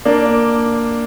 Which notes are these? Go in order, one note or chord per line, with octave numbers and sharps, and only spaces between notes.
A#3 D4